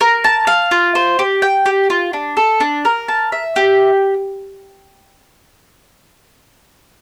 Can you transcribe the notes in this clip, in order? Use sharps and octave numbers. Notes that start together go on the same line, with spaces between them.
A#4
A5
F5
F4
C5
G4
G5
G4
F4
D4
A4
D4
A#4
A5
E5
G4